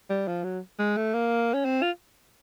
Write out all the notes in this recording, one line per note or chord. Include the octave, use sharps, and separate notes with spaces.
G3
F3
F#3
G#3
A3
A#3
C#4
C4
F4